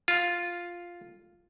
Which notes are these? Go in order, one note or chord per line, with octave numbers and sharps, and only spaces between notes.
F4